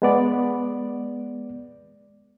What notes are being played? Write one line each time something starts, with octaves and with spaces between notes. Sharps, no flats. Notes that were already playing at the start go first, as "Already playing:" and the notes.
G#3 B3 D5